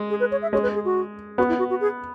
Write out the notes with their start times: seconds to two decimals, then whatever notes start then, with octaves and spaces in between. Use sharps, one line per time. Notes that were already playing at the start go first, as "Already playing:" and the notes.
Already playing: G#3
0.10 G#4
0.20 B4
0.31 C#5
0.42 E5
0.53 G#3 C#5
0.63 B4
0.74 G#4
0.85 F#4
1.38 B3 F#4
1.49 E4
1.59 F#4
1.70 F#4
1.81 G#4